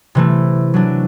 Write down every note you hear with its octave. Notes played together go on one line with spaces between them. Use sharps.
C3 E3 A3
F#3 A3 D4